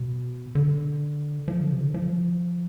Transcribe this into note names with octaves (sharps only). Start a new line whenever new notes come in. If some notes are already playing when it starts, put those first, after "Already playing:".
Already playing: B2
D3
F3
D3
C3
D3
F3